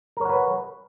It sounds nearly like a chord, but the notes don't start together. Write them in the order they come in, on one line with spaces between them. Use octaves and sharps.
A#4 C#5 F#5 B4